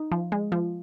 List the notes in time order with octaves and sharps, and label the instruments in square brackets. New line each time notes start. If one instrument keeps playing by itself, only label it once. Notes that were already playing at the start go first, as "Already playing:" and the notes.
Already playing: [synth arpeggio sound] D#4
F3
G#3
F3